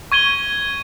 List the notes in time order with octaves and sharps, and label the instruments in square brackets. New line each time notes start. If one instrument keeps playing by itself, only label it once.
[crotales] C#6 G#6 D#7 G7